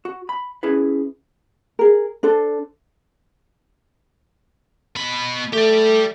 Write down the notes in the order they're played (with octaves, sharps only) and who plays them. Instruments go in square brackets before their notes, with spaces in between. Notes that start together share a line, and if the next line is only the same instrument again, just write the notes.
[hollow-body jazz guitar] F#4
B5
C#4 E4 G#4 B4
[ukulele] G#4 A#4
D4 A4 C5
[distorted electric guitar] B2 B5
[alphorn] A3 [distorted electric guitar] G4 D5